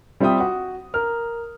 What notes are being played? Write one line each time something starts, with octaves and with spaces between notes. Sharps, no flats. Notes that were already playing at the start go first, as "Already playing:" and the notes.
G3 C4 F4 E5 G5 D#6
F#4
A#4 F6